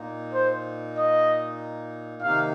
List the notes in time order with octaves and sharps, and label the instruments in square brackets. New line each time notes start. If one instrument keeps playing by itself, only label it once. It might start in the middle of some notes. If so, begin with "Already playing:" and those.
Already playing: [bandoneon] A#2 A#3 D#4
[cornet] C5
D#5
[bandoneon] C3 D#3 A#3 D#4 [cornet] F5